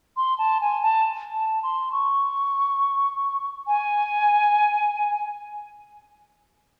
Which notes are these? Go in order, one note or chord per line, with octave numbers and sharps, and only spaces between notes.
C6
A5
G#5
A5
A5
C6
C#6
G#5